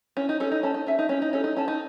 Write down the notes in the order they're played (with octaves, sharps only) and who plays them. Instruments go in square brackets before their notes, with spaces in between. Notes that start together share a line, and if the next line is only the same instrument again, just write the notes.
[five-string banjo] C#4 [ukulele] E4
[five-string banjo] D#4
[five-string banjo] C#4 [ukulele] A4
[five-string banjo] D#4
[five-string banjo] C#4 [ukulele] A5
[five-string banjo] D#4
[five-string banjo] C#4 [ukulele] E5
[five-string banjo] D#4
[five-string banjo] C#4 [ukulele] E4
[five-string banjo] D#4
[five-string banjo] C#4 [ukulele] A4
[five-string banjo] D#4
[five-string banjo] C#4 [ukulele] A5
[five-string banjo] D#4